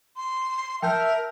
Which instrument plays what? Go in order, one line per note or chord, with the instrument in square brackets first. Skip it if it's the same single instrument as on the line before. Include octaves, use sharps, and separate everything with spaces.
[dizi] C6
[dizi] A#4 [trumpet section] E5 [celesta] G5 A5 G6